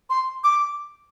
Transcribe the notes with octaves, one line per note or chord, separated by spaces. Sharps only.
C6
D6